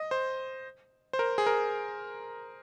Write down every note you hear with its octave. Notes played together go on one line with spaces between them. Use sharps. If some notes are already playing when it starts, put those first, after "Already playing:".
Already playing: D#5
C5
C5
A#4
G#4
A#4